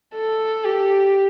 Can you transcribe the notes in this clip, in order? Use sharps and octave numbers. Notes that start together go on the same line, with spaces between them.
A4
G4